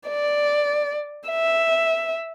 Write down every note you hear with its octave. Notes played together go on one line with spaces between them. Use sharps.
D5
E5